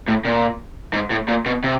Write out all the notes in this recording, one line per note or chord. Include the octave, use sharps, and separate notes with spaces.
A2
A#2
G#2
A2
A#2
B2
C3